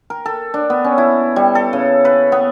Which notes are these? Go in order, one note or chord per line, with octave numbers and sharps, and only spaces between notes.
A#4
A4
D4
B3
C#4
E4
G3
A4
C#3
B4
B3